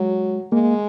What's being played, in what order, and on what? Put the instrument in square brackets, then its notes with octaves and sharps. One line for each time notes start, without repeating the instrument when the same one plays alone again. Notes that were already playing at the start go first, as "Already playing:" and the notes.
Already playing: [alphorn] F#3 [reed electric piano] G#3
[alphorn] G#3 [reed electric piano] A#3